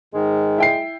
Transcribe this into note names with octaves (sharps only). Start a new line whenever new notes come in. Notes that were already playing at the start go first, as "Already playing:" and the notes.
G#2 D#3 G#3
E4 G5 C7